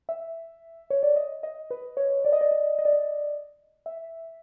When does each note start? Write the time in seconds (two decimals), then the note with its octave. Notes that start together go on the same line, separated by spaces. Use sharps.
0.09 E5
0.90 C#5
1.03 D5
1.16 D#5
1.43 D#5
1.71 B4
1.97 C#5
2.25 D5
2.33 D#5
2.41 D5
2.51 D5
2.79 D#5
2.85 D5
2.93 D#5
3.86 E5